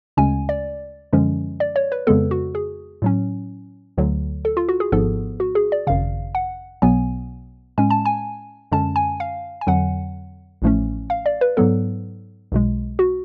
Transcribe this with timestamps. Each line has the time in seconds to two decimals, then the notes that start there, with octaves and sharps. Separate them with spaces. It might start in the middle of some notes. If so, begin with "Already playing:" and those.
0.17 D2 C#3 G#3 C#4 G#5
0.49 D5
1.13 F#2 D3 F3 G#3 C#4
1.60 D5
1.76 C#5
1.92 B4
2.07 F2 C#3 G#3 B3 A4
2.31 F#4
2.55 G#4
3.02 A2 F#3 C#4
3.98 D2 D3 F#3
4.45 A4
4.57 F4
4.69 F#4
4.80 G#4
4.92 G#1 G#2 F3 B3 A4
5.40 F#4
5.55 G#4
5.72 D5
5.87 G#1 F#2 C#3 F5
6.35 F#5
6.82 B1 B2 F#3 B3 G#5
7.78 A2 G#3 C#4 G#5
7.90 A5
8.05 G#5
8.72 F#2 D3 G#3 C#4 A5
8.96 G#5
9.20 F5
9.61 G#5
9.67 F2 D3 F#3 F#5
10.62 A1 A2 F3 A3 C#4
11.10 F5
11.26 D5
11.41 B4
11.57 G#2 F#3 B3 A4
12.52 B1 B2 G#3
12.99 F#4